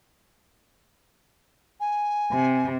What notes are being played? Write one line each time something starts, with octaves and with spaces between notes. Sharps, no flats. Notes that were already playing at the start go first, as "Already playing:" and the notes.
G#5
C3